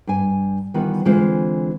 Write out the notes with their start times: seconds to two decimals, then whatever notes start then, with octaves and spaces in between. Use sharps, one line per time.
0.07 G2 G#5
0.74 D#3 E3 G3 B3 F4
1.05 D3 E3 G#3 C4 F4 C5